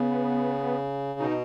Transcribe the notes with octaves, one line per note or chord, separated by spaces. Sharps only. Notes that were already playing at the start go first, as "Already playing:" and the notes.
Already playing: C#3 B3
B2 D#4